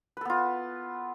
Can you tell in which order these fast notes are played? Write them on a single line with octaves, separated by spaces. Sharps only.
B4 A4 B3 F4